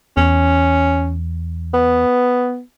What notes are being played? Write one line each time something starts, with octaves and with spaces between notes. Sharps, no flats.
E2 C#4
B3